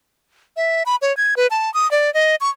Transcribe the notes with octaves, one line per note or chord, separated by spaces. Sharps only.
E5
B5
C#5
G#6
B4
A5
D#6
D5
D#5
C#6